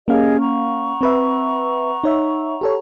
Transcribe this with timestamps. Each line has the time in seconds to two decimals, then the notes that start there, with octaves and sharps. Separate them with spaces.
0.08 A#3 C#4 G4 G#4 D#5 F5
0.40 F#5 A#5 C#6
1.01 C4 B4 E5
2.04 D#4 C#5 E5
2.61 G4 A4 C#5